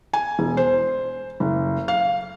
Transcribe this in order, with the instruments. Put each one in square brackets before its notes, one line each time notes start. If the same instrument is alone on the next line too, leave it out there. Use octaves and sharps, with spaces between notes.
[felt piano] G#5
E1
C5
F#1
F5